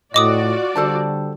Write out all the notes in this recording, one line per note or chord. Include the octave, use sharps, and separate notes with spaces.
A2 F4 F#4 D5 D#5 D6 D#6
D3 G3 A4 C5 A5